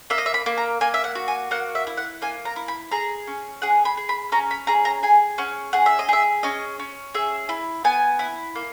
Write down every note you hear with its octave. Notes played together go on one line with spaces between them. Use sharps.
A#3 E5
D#5
E5
B5
A#3
A#5
A#3 G#5
E5
F#5
F#4
G#5
A#3 F#5
E5
E4
F#5
A#3 G#5
A#5
E4
B5
G#4 A#5
C#4
G#4 F#5
B5
G#4
B5
C#4 A#5
B5
G#4 A#5
A#5
G#4 G#5
C#4 F#5
G#4 F#5
E5
D#5
G#4 E5
C#4 D#5
C#4
G#4 E5
E4
B3 G#5
E4
A#3